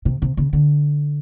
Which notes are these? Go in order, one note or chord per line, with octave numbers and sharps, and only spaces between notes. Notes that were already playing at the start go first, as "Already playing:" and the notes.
C3
C3
C#3
D3